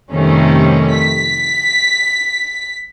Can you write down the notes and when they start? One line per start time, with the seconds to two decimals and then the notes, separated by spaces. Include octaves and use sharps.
0.12 F2 C3 D#3 G3 A3 C#4
0.96 B6